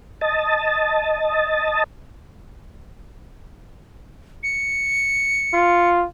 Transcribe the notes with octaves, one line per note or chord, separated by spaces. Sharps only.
D#5 A5
C#7
F4